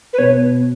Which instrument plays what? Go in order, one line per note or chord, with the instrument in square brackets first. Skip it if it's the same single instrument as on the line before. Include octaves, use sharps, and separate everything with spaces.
[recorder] B4
[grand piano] B2 [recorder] C#5